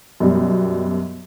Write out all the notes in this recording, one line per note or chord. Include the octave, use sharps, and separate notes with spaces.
F#2 B2 G3